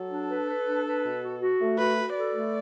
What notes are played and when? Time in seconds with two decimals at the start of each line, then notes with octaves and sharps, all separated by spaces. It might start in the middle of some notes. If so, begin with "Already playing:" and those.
Already playing: F#3 A4
0.10 D4
0.29 B4
0.48 B4
0.66 D4
0.85 B4
1.04 B2
1.22 F#4
1.40 F#4
1.60 A3
1.78 F#4 B4
1.96 F#4
2.15 A4 D5
2.33 A3